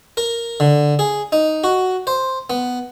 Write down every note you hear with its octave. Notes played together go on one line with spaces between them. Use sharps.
A#4
D3
G#4
D#4
F#4
C5
B3